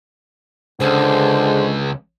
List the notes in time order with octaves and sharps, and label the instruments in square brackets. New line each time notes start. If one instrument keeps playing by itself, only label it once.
[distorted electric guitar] C#2 [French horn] D3 [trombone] G#3 [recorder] C5